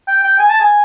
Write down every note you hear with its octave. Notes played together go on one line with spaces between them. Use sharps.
G5
G5
G#5
A5
G#5